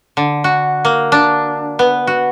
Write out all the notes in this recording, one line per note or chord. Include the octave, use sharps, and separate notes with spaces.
D3
F#4
A#3
D4
B3
F#4